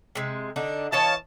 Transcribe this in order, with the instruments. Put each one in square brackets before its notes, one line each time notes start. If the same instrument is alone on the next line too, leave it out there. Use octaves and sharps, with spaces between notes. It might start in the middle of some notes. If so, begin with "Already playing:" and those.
[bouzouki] C3 G#3
D3 D4 D#4
[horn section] E3 A5 [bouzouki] C#5 D#5 F5